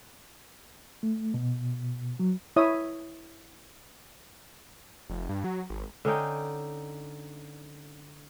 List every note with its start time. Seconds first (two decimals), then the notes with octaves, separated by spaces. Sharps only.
1.03 A3
1.34 B2
2.19 F#3
2.56 E4 C#5 E5 D#6
5.10 F1
5.29 G2
5.44 F#3
5.70 G#1
6.05 D3 C#4 D#4 G5